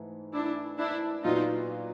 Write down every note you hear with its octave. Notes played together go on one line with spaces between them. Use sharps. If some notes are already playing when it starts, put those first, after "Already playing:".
Already playing: G#2 E3 A3
D4 E4
D4 E4
A#2 F#3 B3 D4 D#4 F4 F#4